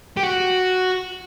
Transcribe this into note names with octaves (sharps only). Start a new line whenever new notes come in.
G4
F#4